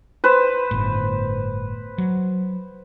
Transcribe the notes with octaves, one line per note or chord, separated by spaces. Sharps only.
B4 C5
G1 A2
F#3